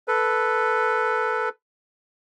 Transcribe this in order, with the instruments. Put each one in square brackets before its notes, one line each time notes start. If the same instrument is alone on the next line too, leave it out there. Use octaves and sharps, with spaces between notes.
[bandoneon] A4 B4